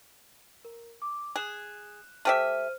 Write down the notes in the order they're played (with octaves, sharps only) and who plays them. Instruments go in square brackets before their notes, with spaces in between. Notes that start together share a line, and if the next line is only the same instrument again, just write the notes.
[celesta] A#4
D6
[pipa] G#4 [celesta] F#6 E7
[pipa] A3 G4 E5 [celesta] C5 F6 D#7